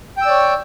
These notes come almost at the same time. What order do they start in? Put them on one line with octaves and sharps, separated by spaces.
G5 E6 D5 C#5